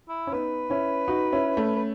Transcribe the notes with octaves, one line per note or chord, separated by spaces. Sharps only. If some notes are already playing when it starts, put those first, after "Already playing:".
E4
C#4
B3 D#4 B4
C#4 E4
D#4 F#4
C#4 E4
A3 C#4
B4